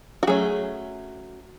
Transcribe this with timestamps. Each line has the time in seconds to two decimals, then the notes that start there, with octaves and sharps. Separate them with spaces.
0.23 F#4
0.27 F#3 A3 C#4 G#4